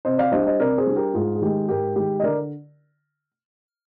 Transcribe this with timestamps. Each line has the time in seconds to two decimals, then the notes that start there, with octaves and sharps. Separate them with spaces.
0.05 C3 C5 D#5
0.18 D5 F5
0.32 G3 D4 C5 D#5
0.47 C5 D#5
0.59 C3 A#4 D5
0.78 G#4 C5
0.87 G3 D4
0.96 G4 A#4
1.14 G#2 F4 G#4
1.35 G#4
1.41 D#3 G#3 G4
1.69 G#2 G4 A#4
1.96 D#3 G#3 G4
2.20 D#5
2.23 D3 A#4 D5